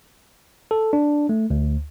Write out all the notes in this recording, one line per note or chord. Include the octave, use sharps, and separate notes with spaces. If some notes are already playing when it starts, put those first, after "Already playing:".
A4
D4
A3
D2